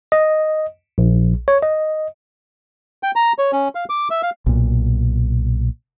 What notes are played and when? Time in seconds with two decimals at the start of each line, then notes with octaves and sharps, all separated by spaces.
0.12 D#5
0.98 A#1
1.48 C#5
1.63 D#5
3.03 G5
3.16 A#5
3.39 C#5
3.52 C#4
3.75 F5
3.90 D6
4.10 E5
4.23 F5
4.46 B1 A#2